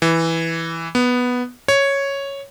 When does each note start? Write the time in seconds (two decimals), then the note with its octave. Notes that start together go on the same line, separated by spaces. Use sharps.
0.02 E3
0.95 B3
1.68 C#5